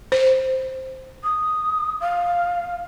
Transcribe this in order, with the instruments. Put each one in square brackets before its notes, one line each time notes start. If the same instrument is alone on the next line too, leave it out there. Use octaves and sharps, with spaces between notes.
[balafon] C5
[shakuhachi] D#6
F5